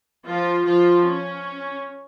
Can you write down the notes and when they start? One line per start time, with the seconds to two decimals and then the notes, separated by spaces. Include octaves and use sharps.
0.26 F3 F4
0.65 F3 F4
1.06 C#4